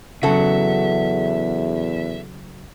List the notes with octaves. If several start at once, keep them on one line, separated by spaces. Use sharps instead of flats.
E2 C#3 F#3 F#4 A4 E5